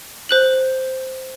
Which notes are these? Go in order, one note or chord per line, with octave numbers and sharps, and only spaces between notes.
C5 F#6 F#7